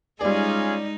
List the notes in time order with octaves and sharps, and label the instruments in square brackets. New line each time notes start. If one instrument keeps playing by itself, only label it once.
[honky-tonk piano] G3 D5 [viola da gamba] G#3 D#4 [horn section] C#4 F4 G#4